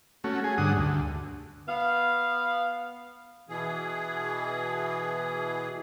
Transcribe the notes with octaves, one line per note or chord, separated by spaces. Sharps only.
A3 C#4 F#4
G#4
G2 D3 F#5 D#6
D2
B3 F5
B2 E3 G#4